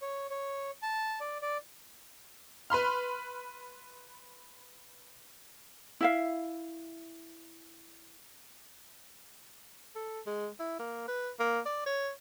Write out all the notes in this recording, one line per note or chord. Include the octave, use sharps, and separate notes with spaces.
C#5
C#5
A5
D5
D5
B4 B5 C6 F6
E4 E5 F5
A4
G#3
E4
A#3
B4
A#3
D5
C#5